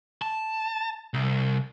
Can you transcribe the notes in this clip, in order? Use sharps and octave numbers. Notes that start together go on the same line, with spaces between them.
A5
C2